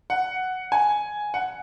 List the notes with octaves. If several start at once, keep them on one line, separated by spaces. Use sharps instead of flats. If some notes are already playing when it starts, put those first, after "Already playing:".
F#5
G#5
F#5